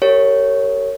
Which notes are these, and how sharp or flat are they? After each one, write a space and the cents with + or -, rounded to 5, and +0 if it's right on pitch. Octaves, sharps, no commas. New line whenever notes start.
G4 +0 A#4 -35 C#5 +0